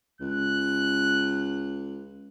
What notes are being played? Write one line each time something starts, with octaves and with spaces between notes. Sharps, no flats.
C#2 F#6